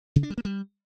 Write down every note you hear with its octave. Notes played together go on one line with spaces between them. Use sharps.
C#3
D4
G3
A#3
G3